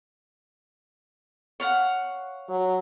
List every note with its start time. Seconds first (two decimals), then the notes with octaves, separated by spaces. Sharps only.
1.60 C#5 F5 F#5
2.49 F#3